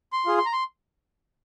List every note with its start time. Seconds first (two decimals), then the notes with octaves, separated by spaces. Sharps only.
0.13 C6
0.26 F4 G#4
0.38 C6
0.46 A#5
0.53 C6